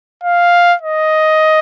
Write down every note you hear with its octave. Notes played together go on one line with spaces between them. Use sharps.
F5
D#5